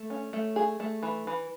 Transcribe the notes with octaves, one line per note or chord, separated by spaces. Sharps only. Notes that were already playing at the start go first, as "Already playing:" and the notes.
Already playing: A3
C#4
A3
G#4
A3
E3
E3